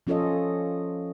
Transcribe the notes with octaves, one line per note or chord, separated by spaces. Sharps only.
F3 C#4 F4 A4 C#5 D#5